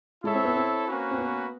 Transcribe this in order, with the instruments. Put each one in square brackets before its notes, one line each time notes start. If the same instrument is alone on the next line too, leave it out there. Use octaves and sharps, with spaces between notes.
[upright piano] G#3 [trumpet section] E4 A4 C#5 E5
[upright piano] C4
B3
C4
[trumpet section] A#3 C#4 F#4 B4
[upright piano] C4
B3